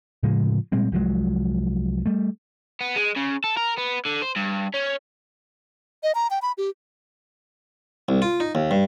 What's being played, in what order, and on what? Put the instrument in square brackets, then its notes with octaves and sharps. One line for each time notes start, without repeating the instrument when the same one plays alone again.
[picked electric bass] A2 C#3 F3 G#3
A#2 G3 G#3 C4
C2 F3 F#3 G#3
G3 A3
[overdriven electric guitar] B3
G#3
C#3
A4
A#4
B3
D3
C5
G2
C#4
[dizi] D#5
A#5
G5
B5
G4
[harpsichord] C2
F4
D#4
D#2
G2